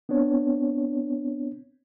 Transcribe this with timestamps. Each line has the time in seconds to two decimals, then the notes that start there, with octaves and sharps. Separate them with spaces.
0.09 B3 C4 D4 C#5